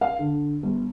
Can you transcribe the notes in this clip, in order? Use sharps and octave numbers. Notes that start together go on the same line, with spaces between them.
F5
D3
G1